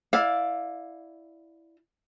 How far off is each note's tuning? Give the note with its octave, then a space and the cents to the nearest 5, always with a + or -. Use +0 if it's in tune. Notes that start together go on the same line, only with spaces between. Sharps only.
E4 +0 D5 +0 F5 +20